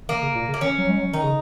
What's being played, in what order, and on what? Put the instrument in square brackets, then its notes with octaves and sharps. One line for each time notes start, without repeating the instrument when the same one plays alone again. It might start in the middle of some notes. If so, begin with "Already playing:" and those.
[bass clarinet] D#3 [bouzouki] A#3
[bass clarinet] C#3
A#2
C#3
[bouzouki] A#3
[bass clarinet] D#3 [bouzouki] C#4
[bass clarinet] F#3
G#3
F#3
[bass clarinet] D#3 [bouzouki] D#4
[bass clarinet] C#3